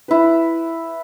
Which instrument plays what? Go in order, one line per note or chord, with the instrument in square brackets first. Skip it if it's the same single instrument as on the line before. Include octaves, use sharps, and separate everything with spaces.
[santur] E4 B4